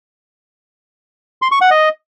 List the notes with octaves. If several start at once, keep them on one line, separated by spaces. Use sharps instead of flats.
C6
C#6
F#5
D#5